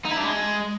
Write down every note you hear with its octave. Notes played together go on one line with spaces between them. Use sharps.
D#4
E4
D4
G#3